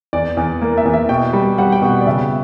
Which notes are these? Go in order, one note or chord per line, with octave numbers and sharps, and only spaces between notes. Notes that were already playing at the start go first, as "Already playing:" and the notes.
E2 D5
E2
A#3
E5
E2
E5
B2 G5
G3
G3 F#5
G5
B2 F#5
D5
C#3 E5